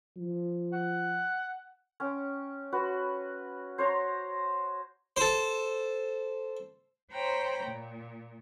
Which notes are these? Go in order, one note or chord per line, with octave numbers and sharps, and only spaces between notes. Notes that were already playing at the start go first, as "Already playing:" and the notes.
F3
F#5
C#4 G5
F#4 B4
C5 C#5 A#5
A4 C5
C5 C#5 G5 A#5 B5
A#2